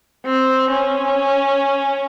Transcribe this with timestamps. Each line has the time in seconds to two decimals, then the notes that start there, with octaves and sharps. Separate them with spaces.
0.26 C4
0.71 C#4